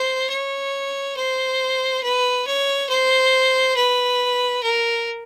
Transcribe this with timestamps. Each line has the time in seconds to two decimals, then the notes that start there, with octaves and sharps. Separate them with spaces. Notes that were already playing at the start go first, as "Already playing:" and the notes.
Already playing: C5
0.29 C#5
1.16 C5
2.03 B4
2.47 C#5
2.89 C5
3.76 B4
4.63 A#4